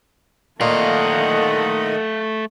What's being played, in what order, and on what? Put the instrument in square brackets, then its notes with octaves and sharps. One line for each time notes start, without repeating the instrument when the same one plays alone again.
[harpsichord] A#2 [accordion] D#3 D#5 [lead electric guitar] A3 F5 [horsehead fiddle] A4 F#5